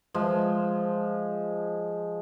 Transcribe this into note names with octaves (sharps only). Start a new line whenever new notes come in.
F3 G#3